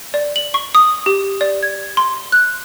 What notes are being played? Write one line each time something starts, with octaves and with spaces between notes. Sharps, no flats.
D5
F#7
C#6
D#6
G4
D5
G#6
C6
F#6